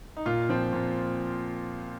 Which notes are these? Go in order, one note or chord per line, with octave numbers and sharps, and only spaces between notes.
D#4
A#2 F4
F3 C4
A#2